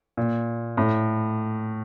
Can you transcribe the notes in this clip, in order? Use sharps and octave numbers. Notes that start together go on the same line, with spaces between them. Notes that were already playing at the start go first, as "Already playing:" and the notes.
A#2
A2